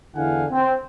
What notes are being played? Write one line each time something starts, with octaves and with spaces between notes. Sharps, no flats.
E2 D3 E4 F5 F#5 G#5
C4